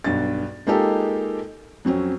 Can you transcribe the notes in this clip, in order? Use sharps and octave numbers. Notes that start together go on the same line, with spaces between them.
B1 G2 A6
G#3 A#3 D#4 F4 G4 A4
F2 F#3 C4 C#4